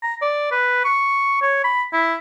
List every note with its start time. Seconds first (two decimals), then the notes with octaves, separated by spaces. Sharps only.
0.02 A#5
0.21 D5
0.52 B4
0.85 C#6
1.42 C#5
1.64 B5
1.93 E4